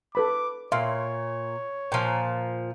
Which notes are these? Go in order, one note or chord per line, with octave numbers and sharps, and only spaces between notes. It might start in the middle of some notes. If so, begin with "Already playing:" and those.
A4 B4 B5 D6
A#2 C#5 E5 F5 C6
A#2 F3 G5